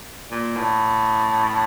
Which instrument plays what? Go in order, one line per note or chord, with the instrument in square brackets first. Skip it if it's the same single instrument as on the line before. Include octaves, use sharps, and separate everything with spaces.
[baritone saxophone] A#2
A2